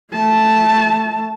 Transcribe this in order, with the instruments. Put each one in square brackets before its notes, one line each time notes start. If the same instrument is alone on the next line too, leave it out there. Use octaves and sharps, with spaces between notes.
[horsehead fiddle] A3 A5